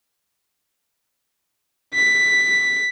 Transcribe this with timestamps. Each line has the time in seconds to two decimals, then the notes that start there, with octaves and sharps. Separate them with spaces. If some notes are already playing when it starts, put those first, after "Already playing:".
1.95 B6